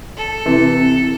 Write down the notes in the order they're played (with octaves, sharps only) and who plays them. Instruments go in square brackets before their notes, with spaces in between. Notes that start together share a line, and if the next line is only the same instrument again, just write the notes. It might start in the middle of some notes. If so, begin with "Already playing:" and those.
[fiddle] A4
[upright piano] C3 E3